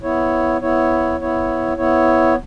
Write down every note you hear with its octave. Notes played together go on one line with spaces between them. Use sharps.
B3 E4 C#5
B3 E4 C#5
B3 E4 C#5
B3 E4 C#5